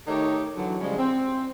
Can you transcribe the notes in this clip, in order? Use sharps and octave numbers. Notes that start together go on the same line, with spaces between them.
D#3 A3 D#4 G4 C#5
D3 E3 F#3
C#3 F3 G3 G#3
C4